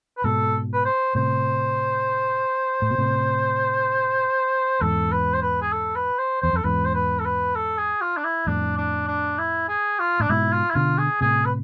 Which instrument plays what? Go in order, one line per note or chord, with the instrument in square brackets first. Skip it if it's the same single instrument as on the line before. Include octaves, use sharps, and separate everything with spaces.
[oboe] B4
[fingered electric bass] G#2 B2 [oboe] A4
[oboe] B4
C5
[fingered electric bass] A2 C3 [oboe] C5
[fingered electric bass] A2
B2
A2 C3
[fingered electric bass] E2 G#2 [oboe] A4
[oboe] B4
C5
B4
G#4
A4
B4
C5
[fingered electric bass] E2 [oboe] C5
[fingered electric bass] F2 [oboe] A4
[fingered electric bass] E2 G#2 [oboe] B4
[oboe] C5
B4
A4
B4
A4
G#4
F4
D4
E4
[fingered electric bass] F2 A2 [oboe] D4
[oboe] D4
D4
E4
G#4
F4
[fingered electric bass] A2 [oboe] D4
[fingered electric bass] G#2 B2 [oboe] E4
[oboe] F4
E4
[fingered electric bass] B2 D3 [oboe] F4
[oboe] G#4
[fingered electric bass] A2 C3 [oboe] G#4
[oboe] B4